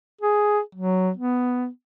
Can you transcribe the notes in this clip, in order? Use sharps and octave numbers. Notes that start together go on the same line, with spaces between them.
G#4
F#3
B3